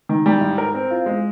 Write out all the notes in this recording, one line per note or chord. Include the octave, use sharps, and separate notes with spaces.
D#3
G3
G#2
A#4
C4
F4
G#3